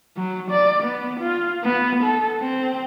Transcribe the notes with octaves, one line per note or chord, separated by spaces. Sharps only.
F#3
D5
B3
F4
B3
A4
C4